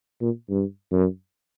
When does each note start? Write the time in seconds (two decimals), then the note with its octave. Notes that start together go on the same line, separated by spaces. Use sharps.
0.21 A#2
0.50 G2
0.92 F#2